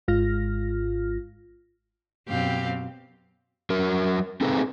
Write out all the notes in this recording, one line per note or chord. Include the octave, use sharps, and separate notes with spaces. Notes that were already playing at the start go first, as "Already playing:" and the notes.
G#1 G#2 G#3 F4 F6 A#6
F#2 B2 C4 G4 F5
F#3 A#4
C4 D#4 G#4 A4 B4